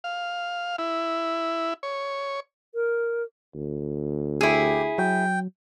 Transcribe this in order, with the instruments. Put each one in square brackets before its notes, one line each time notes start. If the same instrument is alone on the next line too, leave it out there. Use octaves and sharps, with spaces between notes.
[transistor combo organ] F5
E4
C#5
[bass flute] A#4
[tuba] D2
[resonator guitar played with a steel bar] E4 G#4 [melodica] G4
[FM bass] F#3 [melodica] G5